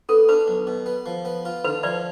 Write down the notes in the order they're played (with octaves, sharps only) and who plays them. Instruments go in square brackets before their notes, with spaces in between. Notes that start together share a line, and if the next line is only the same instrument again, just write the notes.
[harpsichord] B3 [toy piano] A4
[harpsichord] D4 [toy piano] B4
[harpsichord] B1
B2
B3
F3
B3
F4
[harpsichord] D3 [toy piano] B4
[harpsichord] F3 [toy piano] B4 D5